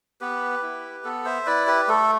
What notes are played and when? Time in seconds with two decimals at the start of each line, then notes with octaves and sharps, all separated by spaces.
0.21 B3 G4 B4
0.63 E4
1.04 B3 A4
1.25 C5 E5
1.46 E4 B4 D5
1.67 G4 B4
1.88 A3 A4